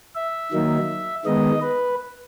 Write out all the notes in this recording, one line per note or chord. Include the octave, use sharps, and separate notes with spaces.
E5
D#3 F#3 A#3 D#4
D#3 G#3 B3 D#4 D#5
B4